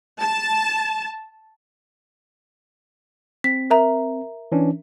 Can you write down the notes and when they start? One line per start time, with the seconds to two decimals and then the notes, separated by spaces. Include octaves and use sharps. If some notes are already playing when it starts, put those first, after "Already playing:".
0.21 A5
3.44 C4 B6
3.70 A#4 E5 A#5
4.52 E3 C#4 D4